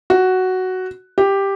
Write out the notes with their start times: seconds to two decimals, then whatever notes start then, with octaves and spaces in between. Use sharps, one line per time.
0.10 F#4
1.18 G4